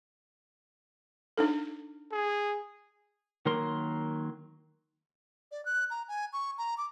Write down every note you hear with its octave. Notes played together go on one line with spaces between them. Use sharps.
D4 D#4 A4
G#4
D#3 F#3 A#3 A#4 C6
D5
F#6
A#5
G#5
C#6
A#5
D6